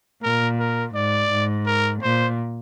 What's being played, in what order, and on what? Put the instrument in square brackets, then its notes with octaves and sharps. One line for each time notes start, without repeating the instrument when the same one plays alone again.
[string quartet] A#2 [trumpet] A#4
[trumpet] A#4
[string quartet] G#2 [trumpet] D5
[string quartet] G#2
[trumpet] A#4
[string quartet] A#2 [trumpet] C5